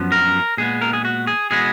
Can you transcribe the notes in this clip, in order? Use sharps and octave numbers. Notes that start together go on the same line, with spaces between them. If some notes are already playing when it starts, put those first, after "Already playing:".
Already playing: F#2 F3 B3
A#4
A#2 G#3 B3 G#4
A#4
G#4
F#4
G#4
B2 G#3 B3 G#4